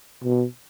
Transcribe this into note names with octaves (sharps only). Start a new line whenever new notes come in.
B2